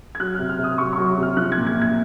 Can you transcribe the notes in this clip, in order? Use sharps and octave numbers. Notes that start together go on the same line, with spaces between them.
G#6
F#3 F#6
C3 F6
F6
C3 D#6
F#3 C#6
C#6
F#3
C3 F6
F3 F#6
G#6
A#2
G#6
A#2
G#6